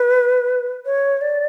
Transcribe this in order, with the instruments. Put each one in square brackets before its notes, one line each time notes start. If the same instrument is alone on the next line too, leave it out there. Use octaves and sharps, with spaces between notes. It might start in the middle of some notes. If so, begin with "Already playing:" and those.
Already playing: [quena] B4
C#5
D5